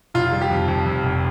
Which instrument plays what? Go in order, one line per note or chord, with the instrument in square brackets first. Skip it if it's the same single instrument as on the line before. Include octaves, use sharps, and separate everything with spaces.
[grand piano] F1 F4
G3
G4
F2
F2
F2
F1